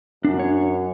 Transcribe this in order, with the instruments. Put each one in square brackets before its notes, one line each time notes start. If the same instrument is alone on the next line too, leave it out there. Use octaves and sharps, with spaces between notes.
[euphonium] F#2 [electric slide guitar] D4
[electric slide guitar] C#5